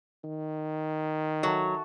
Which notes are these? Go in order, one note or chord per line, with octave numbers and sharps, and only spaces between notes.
D#3
F#3 F#4 A4 E5